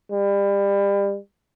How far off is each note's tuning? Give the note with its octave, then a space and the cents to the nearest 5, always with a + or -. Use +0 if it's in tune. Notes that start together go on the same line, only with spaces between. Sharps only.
G3 +30